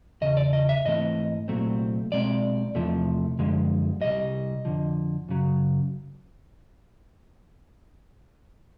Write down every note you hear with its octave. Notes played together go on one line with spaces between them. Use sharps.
E2 C#3 D#5
D5
D#5
E5
G#2 E3 A3 C4 D#5
C2 A#2 F#3 A3 C4
B1 B2 G#3 C4 D5
E2 C3 F3 A3
F#2 D3 F3 G#3
C2 B2 G3 D#5
F2 D3 F3
F#2 C#3 F#3